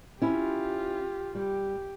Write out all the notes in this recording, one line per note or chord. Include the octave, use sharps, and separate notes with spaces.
C#4 E4 F4 G4
G3 G4